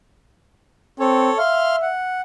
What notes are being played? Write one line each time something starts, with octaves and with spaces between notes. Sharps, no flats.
C4 A4 C#5
E5 F5 C6 F6
F#5